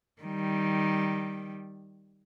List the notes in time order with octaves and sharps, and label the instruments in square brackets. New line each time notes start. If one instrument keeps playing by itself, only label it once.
[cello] D#3 G3